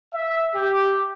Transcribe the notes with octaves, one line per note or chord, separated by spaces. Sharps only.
E5
G4